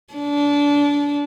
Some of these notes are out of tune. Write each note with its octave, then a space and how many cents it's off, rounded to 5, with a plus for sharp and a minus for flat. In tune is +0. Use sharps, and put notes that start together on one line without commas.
D4 -25